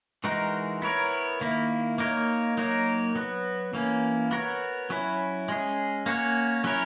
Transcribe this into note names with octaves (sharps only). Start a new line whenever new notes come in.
E3 G#3 D#4 F#4 A#4
B3 E4 A#4 C#5
D#3 A#3 E4
A#3 D#4 A#4 C#5
F#3 A#3 D#4 A#4 C#5
F#3 B3 F#4
E3 A#3 C#4
B3 F#4 A#4 C#5
F#3 C#4 E4
G#3 C#4 G#4
A#3 C#4 F#4 C#5
F#3 C#4 E4 A#4 C#5